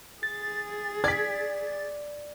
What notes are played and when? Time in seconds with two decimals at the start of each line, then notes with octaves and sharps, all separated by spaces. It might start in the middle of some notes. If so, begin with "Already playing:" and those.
0.23 G#4 A6
1.04 D5 G#6 B6